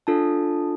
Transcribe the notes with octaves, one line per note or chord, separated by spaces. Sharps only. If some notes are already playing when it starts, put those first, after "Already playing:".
D4 F4 A4 A5